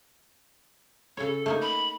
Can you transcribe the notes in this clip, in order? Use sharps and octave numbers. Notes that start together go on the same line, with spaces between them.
C#3 A4 C#5
A3 A#3 D#4
B5